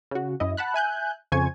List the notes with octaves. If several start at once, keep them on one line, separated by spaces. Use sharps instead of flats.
C#3 F#4
F#2 E4 D#5
F#5 A5 B5 F#6
E5 G#5 F#6 G6
F2 C#3 C5 G#5 C#6 G#6